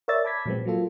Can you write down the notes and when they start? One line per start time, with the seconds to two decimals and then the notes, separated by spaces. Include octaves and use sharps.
0.08 A#4 C#5 D5 E5 E6 A6
0.25 A5 B5 D6 G#6 B6
0.46 A#2 F3 F#3 G#3 B3 C4
0.65 F#3 A#3 F4 A4